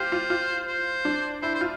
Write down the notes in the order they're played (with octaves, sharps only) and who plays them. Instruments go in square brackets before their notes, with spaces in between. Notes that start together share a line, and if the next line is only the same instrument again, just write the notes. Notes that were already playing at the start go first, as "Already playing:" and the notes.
Already playing: [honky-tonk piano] F4 G4 [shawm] C5
[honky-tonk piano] F4
F4
[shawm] C5
[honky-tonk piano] D4
[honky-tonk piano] E4 [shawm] C5
[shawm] C5
[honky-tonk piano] F4